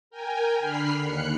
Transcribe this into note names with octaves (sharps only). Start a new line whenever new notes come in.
A#4 G5 G#5
D3 B5 F6 C7
D#2 F#6 C#7